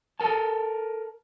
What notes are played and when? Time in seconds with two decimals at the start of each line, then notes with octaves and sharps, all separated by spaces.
0.20 A4 A#4 G#5 A5